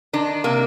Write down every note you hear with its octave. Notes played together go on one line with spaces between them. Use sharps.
D#3 D4
C3 A#3